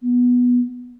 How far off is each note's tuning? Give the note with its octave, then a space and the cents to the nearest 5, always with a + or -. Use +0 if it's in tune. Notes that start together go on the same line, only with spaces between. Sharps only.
B3 -10